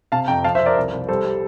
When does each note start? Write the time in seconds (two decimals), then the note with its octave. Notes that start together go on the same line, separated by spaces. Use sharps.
0.12 C3 F5 A5
0.28 F2 G5 A#5
0.44 F3 F5 A5
0.55 C5 E5
0.60 F3
0.66 A#4 D5
0.77 C2
0.93 C2
1.08 G3 A4 C5
1.25 G3